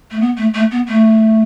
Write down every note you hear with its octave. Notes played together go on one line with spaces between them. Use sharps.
A3
B3
A3
A3
B3
A3